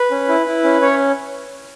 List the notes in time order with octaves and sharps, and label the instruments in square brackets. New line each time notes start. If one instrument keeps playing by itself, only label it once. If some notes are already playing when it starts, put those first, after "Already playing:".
Already playing: [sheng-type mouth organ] B4
C#4
E4
E4
C#4
C#4 C#5